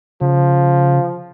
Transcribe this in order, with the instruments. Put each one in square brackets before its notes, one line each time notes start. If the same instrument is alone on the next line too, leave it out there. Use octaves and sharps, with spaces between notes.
[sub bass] C#3 [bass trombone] F3